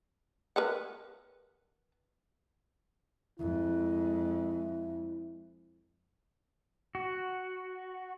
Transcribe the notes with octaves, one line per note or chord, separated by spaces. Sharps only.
A#4 B4 F#5
F2 G#3 E4
F#4